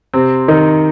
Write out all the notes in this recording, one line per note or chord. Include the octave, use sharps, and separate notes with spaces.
C3 C4
D#3 D#4